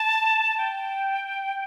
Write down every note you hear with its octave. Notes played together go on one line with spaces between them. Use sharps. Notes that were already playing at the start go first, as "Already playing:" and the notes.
Already playing: A5
G5